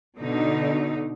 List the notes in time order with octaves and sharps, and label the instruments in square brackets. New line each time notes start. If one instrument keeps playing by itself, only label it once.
[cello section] B2 D3 D#4